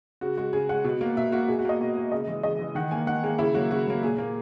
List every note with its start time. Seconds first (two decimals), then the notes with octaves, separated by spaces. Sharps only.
0.21 C#3 F#4
0.37 G#3 F#4
0.53 C#3 G#4
0.69 G#3 F#5
0.84 B2
1.01 A#3
1.17 B2 E5
1.32 A#3 F#4
1.48 B2 G#4
1.59 F#4
1.65 A#3 D#5
1.81 B2
1.97 A#3
2.12 C#3 D#5
2.27 E3 G#3
2.43 C#3 D#5
2.59 E3 G#3
2.75 D#3 F#5
2.91 A#3 G#5
3.07 D#3 F#5
3.23 A#3 G#4
3.39 C#3 E4
3.55 F#3 A#3 F#4
3.71 C#3 F#4
3.87 F#3 A#3
4.02 A#2 G#4
4.18 A#3